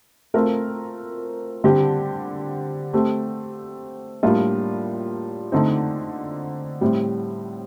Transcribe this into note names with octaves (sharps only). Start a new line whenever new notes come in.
A3 C4 F4 A#4
D3 G3 C4 G4
A3 C4 G4
A2 G3 A#3 D4 F4
D3 A3 C4 D#4
A2 G3 C4